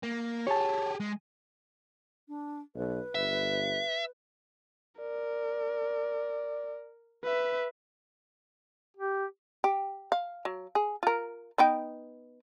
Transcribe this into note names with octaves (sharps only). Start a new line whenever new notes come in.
A#3
G4 G#4 C#5 A5
G#3
D4
B1 B4
G1 E5
A#4 D5
B4 E5
G4
G4
F5
F#3
G#4
F4 A#4
B3 D#4 G5